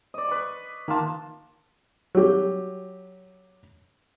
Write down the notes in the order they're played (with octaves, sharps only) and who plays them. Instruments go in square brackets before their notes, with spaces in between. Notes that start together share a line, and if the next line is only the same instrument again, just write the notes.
[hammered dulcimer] D5 D#5
B4 C#6
[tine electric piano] D#3 A5 [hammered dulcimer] A#3 F4
[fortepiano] F#3 G4